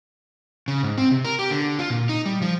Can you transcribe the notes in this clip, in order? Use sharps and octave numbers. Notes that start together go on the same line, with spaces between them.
C#3
G#2
C4
C3
A#4
G4
D3
F4
A#2
D#4
G3
F3